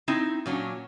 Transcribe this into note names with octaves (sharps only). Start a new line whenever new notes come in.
C4 D#4 E4
A#2 F#3 C#4 D4